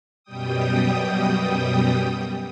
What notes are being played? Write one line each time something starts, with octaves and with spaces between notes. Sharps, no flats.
F#2 B2 G3 G5 D#6